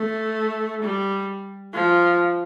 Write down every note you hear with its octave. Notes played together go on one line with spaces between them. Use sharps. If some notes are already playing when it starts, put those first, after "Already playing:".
Already playing: A3
G3
F3